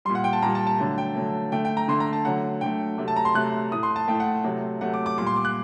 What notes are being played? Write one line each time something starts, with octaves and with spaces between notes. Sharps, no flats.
A#2 G3 C6
F#5
G5
A5
A#2 G3 A#5
A5
A5
D3 F#3 A3 A5
G5
D3 F#3 A3
D3 A3 G5
G5
A#5
D3 A3 C6
A#5
A5
D3 F#3 A3 F#5
D3 F#3 A3 G5
C3 F#3 A3
A5
A#5
C6
C3 F#3 A3 F#6
A2 A3 D#6
C6
A5
A2 A3 G5
F#5
C3 F#3 A3
C3 F#3 A3 F#5
D6
D6
A#2 G3 D6
C6
D6
F#6